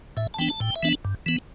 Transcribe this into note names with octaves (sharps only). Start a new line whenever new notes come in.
A2 E5
A5
E3 B3 D4 G5
A5
A2 G5
E5
E3 B3 D4
G2
E3 B3